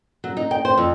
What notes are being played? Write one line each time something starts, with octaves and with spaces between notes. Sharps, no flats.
F#3
D#4
G5
C5
F2